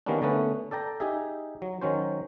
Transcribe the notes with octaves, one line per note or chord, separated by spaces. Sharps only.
D#3 G3 A#3 B3 C#4 D4
D3 A3 B3 C#4 B4
A4 D5 G5 A#5
D#4 G4 G#4 E5
F#3
D#3 F#3 C#4 C5